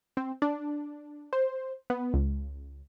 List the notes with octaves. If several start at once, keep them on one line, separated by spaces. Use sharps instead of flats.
C4
D4
C5
B3
C#2